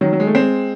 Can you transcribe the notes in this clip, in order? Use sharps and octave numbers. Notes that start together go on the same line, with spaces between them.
D#3 F#3
F#3
G#3
A3
G#3 C4